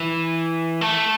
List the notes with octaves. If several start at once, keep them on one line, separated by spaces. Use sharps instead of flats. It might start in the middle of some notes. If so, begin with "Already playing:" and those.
Already playing: E3
A3